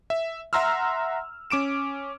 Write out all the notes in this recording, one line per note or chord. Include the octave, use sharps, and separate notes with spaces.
E5
E5 F#5 A#5 C6 E6 F6
C#4 D6 D7 E7